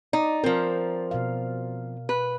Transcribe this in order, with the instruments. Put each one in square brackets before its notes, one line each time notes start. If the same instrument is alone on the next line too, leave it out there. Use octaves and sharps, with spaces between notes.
[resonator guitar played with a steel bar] D#4 [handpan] D5
[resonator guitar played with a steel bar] F3 C4 [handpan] A#4
[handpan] B2 F5
[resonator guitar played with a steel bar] B4